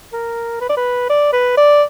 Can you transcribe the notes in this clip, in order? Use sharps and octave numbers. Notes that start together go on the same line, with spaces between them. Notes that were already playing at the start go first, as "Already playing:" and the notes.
A#4
B4
D5
B4
D5
B4
D5